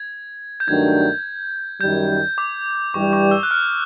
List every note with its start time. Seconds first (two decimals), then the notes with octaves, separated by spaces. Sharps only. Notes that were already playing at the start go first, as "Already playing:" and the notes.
Already playing: G#6
0.60 G6
0.67 G2 D#3 F#3 A3 D4 G#6
1.81 F#2 D#3 G3 G6
2.38 D6
2.94 G2 E3 G3 C#6
3.13 C#6
3.31 E6
3.43 F#6
3.51 F6